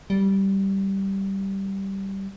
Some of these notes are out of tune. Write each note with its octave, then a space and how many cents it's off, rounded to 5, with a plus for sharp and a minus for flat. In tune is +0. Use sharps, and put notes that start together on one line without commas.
G3 -10